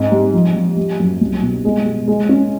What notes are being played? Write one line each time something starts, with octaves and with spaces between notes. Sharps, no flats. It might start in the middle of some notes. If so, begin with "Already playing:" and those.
Already playing: G#2 C4
G3
F3
F3
G3
F#2
C2
B2
G#3
G#3
G#3
C#4